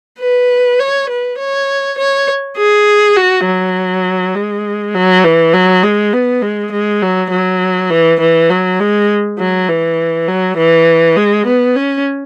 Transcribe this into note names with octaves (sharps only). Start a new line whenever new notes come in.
B4
C#5
B4
C#5
C#5
G#4
F#4
F#3
G#3
F#3
E3
F#3
G#3
B3
G#3
G#3
F#3
F#3
E3
E3
F#3
G#3
F#3
E3
F#3
E3
G#3
B3
C#4